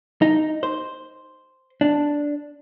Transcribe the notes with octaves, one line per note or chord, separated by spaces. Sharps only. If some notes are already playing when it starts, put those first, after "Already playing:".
D#4
C5
D4